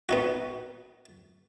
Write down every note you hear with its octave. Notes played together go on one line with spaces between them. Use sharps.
B3 D#4 F#4